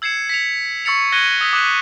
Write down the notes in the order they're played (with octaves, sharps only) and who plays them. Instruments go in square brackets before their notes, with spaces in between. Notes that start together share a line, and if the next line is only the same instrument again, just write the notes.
[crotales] E6 G#6 C7 C#7 E7
B6 C#7 F7
C#6 E6 A6 C#7 F7
F#6 G#6 A#6 D#7 G7
D#6 E6 G#6 B6
D6 D#6 F#6 B6 E7 F#7